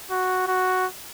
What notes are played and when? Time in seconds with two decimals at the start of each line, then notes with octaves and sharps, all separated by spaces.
0.10 F#4
0.47 F#4